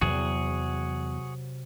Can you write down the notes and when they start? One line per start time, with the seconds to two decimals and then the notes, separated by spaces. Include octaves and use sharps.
0.01 E2 C3 F#3 F#4 G#4